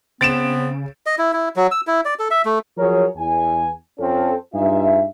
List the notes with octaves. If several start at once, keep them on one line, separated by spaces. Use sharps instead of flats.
C#3 B3 C4 A6 D7 E7
D#5
E4
E4
F#3
E6
E4
D5
A4
E5
A3
F3 F#3 G#4 A#4 C#5
E2 G#5
F2 C4 C#4 F4 A4
G2 D#4 F4 G#4 E5